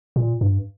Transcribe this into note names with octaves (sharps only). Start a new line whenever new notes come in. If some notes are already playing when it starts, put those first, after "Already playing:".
A#2
G2